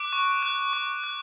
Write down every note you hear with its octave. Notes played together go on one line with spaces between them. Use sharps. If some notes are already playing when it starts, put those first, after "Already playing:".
Already playing: D6 F#6 D7
C#6
F#6
C#6
F#6